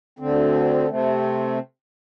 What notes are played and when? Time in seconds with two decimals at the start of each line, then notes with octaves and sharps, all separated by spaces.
0.19 D2 D3 C4
0.89 C3 A3 C4